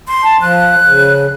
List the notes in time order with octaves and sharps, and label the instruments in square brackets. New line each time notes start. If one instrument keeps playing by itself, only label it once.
[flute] C6
[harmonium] A5
[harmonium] F3 [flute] F#6
[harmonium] C#3